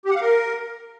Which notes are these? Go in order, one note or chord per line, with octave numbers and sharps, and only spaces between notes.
G4
F#5
F5
A#4